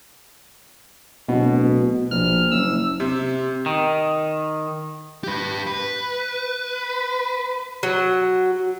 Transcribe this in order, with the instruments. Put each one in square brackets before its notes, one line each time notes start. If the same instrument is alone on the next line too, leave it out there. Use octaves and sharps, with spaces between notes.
[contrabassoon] D1 [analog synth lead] B2
[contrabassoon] A#1 [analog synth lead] F6
[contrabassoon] F#1 [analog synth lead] E6
[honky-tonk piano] C3
[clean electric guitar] D#3
[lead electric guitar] G4 B4
B4
[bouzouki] F#3